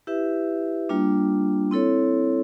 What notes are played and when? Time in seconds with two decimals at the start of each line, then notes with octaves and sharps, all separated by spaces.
0.07 E4 G4 B4 E5
0.89 G3 A#3 D4 F4
1.71 C4 E4 A4 C#5